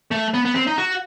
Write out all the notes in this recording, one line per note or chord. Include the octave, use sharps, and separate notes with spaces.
A3
B3
B3
C4
D#4
F#4